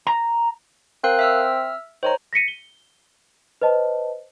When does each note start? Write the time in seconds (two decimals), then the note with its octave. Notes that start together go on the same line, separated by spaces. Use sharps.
0.07 A#5
1.04 C4 A#4 F5 F#6
1.19 E5 E6 F6
2.03 D#3 C5 C#5 A#5
2.33 A#6 B6 C#7 D#7
2.48 G7
3.62 B4 C5 D#5 A5